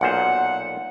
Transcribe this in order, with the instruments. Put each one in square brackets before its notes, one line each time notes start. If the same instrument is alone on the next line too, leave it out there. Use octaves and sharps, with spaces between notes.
[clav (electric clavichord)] B1 A#2 C5 [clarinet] F#5